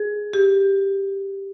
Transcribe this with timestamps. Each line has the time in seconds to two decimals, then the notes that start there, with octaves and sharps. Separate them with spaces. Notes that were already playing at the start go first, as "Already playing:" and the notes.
Already playing: G#4
0.33 G4